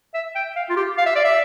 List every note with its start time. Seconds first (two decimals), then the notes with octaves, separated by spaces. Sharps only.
0.14 E5
0.36 G5
0.56 F5
0.70 F4
0.77 G4
0.98 F5
1.06 E5
1.15 D5
1.25 E5